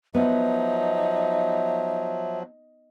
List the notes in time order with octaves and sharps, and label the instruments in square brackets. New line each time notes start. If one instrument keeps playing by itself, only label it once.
[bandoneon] F3 F#3 [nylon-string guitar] B3 [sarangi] D#4 [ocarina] E5